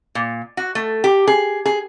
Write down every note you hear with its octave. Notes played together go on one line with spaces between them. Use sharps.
A#2
F#4
A3
G4
G#4
G#4